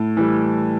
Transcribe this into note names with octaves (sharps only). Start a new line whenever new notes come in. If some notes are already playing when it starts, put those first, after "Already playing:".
Already playing: A2
E3 G3